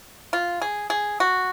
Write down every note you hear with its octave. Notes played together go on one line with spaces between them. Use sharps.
F4
G#4
G#4
F#4